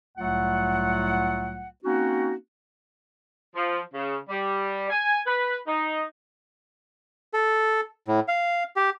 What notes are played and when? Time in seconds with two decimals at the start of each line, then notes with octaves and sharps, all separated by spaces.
0.17 C2 A2 F#3 A3 F4 F#5
1.84 A#3 C4 C#4 D#4 F#4
3.56 F3
3.94 C#3
4.29 G3
4.90 G#5
5.26 B4
5.67 D#4
7.34 A4
8.08 A2
8.28 F5
8.76 G4